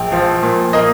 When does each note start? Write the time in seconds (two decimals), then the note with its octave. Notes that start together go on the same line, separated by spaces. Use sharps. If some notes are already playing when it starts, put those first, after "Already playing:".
Already playing: A#1 G5
0.12 F3
0.43 A#2
0.73 A#3 D#5